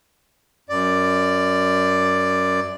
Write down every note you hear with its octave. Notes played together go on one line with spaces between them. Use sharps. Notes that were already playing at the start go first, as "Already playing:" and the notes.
F#2 D5